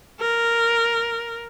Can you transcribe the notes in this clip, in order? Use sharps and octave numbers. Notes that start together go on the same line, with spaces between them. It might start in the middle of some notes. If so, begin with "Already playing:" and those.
A#4